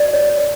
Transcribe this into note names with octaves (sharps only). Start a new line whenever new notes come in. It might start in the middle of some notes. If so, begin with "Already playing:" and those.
Already playing: F#4 D5
C#5